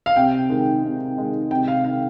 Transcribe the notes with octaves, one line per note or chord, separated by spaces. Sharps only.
F5
C3 G5
D#3 G#3
C3
D#3 G#3
C3 G5
F5
D#3 G#3 F5